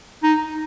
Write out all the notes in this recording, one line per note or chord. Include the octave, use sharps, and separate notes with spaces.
D#4